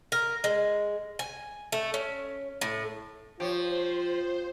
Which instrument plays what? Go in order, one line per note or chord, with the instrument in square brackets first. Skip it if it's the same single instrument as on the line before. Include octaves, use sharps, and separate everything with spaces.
[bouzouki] A#4
G#3
G#5
A3
C#4
A2
[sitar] F3 [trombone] F4 [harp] G4 C#5 [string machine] C5